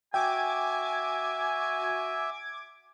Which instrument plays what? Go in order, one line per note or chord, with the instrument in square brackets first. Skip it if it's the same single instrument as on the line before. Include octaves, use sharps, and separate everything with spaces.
[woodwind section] F#4 G#5 [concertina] E5 [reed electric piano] G5 [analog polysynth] D6 G#6